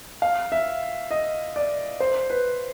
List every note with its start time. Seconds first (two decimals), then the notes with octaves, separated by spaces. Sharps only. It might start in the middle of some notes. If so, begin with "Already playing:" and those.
0.22 F5
0.52 E5
1.11 D#5
1.56 D5
2.00 C5
2.30 B4